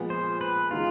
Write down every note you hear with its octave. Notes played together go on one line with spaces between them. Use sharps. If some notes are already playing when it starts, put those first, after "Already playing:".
Already playing: A#2 F3 G#3 B3
C5
B4
E3 G#3 B3 D#4 F4